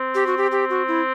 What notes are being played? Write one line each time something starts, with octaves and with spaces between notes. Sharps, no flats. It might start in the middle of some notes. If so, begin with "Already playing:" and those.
Already playing: C4
G4
F#4
G4
G4
F#4
E4